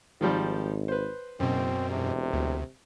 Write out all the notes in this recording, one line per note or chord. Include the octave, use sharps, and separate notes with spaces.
G#1 D#3 F3 G3
B4 C5
F#1 F#2 B2 C4
E1 C3
D2